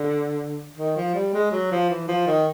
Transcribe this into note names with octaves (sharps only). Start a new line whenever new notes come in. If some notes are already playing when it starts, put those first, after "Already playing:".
Already playing: D3
D#3
F3
G3
G#3
F#3
F3
E3
F3
D#3